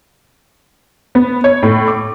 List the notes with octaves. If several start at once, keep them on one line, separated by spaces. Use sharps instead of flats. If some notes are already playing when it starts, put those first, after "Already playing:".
B3
C#5
A2
D6